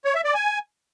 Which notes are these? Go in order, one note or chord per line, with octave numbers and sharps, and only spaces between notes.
C#5
E5
D5
G#5